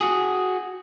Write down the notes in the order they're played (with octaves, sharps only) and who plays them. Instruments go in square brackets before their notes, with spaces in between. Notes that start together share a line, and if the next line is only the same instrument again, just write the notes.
[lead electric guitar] F#4 G#4